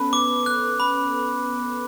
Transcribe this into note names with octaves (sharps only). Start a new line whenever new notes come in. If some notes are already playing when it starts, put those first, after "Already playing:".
Already playing: B3 C#4 A4 B4
D6
F#6
B5